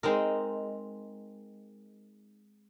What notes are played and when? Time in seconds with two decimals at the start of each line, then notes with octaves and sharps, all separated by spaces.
0.03 G#3 C4 D#4 A#4